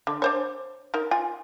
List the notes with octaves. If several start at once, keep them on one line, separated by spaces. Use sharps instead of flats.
D3
D4 C5 C#5
D#4 A#4
F4 G#5